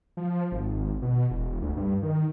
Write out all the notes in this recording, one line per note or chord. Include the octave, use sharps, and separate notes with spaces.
F3
G#1
B2
E1
D2
G2
D#3